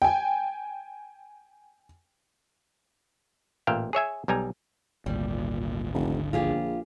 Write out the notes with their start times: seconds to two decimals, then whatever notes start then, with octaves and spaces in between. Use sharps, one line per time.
0.02 G5 G#5
3.67 A1 A#2 E5 F5 G5
3.93 G#4 C#5 E5 G#5
4.28 B1 G3 G#5 A#5
5.06 G#1 D2 A#2 G3
5.94 F1 D3
6.33 A#1 F4 G4 G#4